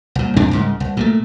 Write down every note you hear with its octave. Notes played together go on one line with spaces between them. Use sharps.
C2 A#2
F#2 C3 C4 D4
C2 G#2 C#3
C2
A#2 D#3 A3